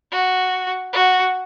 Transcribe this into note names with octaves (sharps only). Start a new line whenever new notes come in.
F#4
F#4